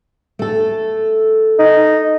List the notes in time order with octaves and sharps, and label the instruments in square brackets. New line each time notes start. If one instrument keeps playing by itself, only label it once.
[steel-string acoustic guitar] A3 A4
[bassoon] D#4